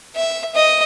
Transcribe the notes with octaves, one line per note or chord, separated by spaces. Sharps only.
E5
D#5